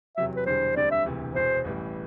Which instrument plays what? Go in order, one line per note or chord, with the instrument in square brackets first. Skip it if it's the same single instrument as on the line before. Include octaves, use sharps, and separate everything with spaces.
[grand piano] E2 C3 F#3 [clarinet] E5
[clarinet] B4
[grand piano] E1 E2 D3 G3 [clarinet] C5
[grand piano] D2 D3 G3 C4 [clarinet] D5
[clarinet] E5
[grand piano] E1 D2 C3 E3
[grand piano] E1 E2 B2 [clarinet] C5
[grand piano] A1 A2 E3 G3